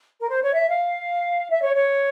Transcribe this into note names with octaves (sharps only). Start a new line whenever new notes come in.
A#4
C5
C#5
E5
F5
E5
C#5
C#5